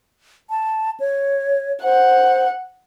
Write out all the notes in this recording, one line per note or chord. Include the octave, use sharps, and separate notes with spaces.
A5
C#5
C5 F#5